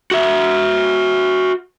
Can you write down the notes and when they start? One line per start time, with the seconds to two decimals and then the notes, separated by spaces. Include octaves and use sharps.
0.11 F#4 E5